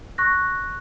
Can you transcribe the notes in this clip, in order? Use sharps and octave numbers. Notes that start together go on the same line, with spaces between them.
C#6 F#6 A#6